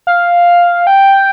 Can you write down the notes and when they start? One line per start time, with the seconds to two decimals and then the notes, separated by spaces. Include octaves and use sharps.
0.07 F5
0.87 G5